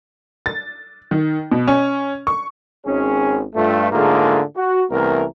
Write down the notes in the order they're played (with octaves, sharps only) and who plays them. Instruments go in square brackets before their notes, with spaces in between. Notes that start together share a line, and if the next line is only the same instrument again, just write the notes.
[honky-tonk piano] A6
D#3
B2
C#4
C#6
[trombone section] G#1 C#4 G#4
G2 A3 F4
G#2 D3 A3 A#3 F4 G#4
F#4
C2 E3 A3 B3 A#4